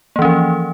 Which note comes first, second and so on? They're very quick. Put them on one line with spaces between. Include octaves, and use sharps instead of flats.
A#3 E3 C#4 F3